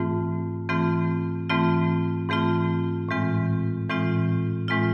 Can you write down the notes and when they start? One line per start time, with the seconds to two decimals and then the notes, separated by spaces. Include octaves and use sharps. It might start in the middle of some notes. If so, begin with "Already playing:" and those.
Already playing: G#2 E3 A3 C4 F4
0.69 G#2 E3 A3 C4 F4
1.50 G#2 E3 A3 C4 F4
2.29 G#2 E3 A3 C4 F4
3.09 A2 E3 G#3 C4 F4
3.89 A2 E3 G#3 C4 F4
4.68 A2 E3 G#3 C4 F4